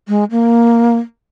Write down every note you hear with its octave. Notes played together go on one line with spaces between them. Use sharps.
G#3
A#3